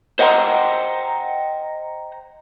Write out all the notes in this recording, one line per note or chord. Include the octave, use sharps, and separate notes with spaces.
C5 D#5 F#5 G5 A#5 C6